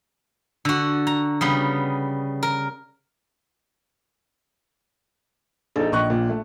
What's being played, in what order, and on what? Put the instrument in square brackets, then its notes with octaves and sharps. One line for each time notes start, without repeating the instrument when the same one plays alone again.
[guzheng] D3 F#4
A#5
C#3 G3 B3
A#4
[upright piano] A#1 D#4 [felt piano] A4
[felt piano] A#1 [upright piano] D#5 C#6 F#6
[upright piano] A#2
A3